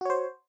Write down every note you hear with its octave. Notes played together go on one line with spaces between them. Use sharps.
F#4 C5 C#5